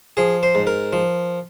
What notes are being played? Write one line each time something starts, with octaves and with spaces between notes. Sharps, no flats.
F3 G#4
C5
G#2
A#4
F3